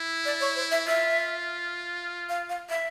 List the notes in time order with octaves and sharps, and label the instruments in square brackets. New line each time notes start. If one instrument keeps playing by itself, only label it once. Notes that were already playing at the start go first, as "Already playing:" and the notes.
Already playing: [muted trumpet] E4
[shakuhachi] D5
C#5
C5
E5
[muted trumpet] F4 [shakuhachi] E5
[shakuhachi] F5
F5
E5